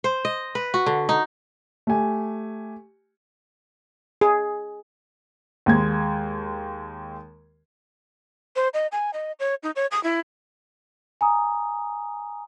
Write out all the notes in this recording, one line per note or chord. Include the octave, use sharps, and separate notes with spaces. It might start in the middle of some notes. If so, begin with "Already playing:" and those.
C5
D#5
B4
F#4
D3
D#4
A3 G4 G#5
G#4
D#2 G#3 G#6
C5
D#5
G#5
D#5
C#5
D#4
C#5
D#6
E4
G#5 A#5 D#6